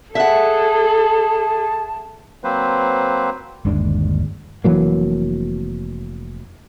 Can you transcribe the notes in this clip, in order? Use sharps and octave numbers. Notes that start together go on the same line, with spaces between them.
G#4 A4 E5 F#5 A5
F#3 A#3 C4 B4 C5
G1 D#2 G#3 D4
F1 E3 F#3 A#3